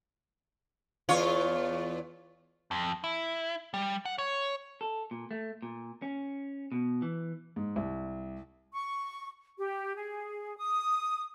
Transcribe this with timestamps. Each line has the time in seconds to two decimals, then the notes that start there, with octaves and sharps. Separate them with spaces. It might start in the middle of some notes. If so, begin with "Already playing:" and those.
1.09 E2 F4 C#5
2.71 F2
3.04 E4
3.74 G3
4.05 F#5
4.18 C#5
4.81 A4
5.11 A#2
5.31 A3
5.62 A#2
6.02 C#4
6.72 B2
7.02 E3
7.56 G#2
7.76 C2
8.74 C#6
9.58 G4
9.96 G#4
10.57 D#6